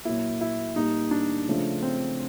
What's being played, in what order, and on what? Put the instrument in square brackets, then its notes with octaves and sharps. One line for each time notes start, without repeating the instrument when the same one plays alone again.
[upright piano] A#2 F#3 A#3 [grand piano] E4
[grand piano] E4
[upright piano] A#2 G3 A#3 [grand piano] D#4
[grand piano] D4
[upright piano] C#3 F3 A3 D4 F4
[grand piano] C4